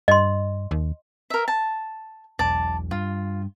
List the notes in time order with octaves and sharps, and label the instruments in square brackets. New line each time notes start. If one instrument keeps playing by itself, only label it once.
[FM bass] G2 [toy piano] D#5 C6
[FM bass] D#2
[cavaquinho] A#4 E5
A5
[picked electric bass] E1 B1 [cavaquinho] D5 A5
[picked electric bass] G2 [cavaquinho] F4